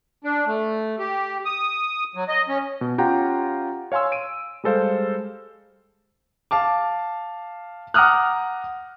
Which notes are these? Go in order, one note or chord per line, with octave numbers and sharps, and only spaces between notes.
D4
A3
G4
D#6
F#3
D#5
C#4
B2
C#4 F4 G4 F#5 G5 A#5
C#5 F5 G#5 C6 E6
D7 D#7
G3 G#3 A4 C5 F5
F5 A5 D6
F#5 A#5 D6 D#6 F6 F#6